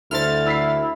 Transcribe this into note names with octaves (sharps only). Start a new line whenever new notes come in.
D2 E4 A4 C5 F6 A6
E4 E6 B6 C7